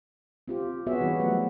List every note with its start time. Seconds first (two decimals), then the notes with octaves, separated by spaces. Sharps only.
0.48 C4 F4 G4
0.87 B3 F#4 G#4 C#5 E5
1.01 E3 G3 D#4 F4
1.20 F3 F#3 A3 F#5